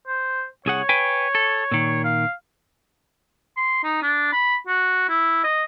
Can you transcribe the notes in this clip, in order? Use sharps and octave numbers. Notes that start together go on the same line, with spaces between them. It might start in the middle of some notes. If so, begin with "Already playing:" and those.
C5
C2 G#4 C#5 F#5
B4 G5 G#5
A4
A#2 D#3
F5
C6
D#4
D4
B5
F#4
E4
D#5